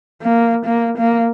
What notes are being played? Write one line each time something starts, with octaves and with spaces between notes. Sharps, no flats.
A#3
A#3
A#3